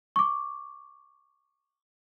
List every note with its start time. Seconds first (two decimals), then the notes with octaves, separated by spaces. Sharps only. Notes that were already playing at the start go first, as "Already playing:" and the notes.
0.16 C#6 D6